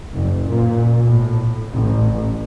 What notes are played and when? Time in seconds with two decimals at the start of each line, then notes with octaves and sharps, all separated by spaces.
0.12 F#1
0.45 A#2
1.02 A2
1.72 A1